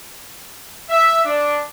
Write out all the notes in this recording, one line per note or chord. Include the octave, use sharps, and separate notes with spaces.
E5
D4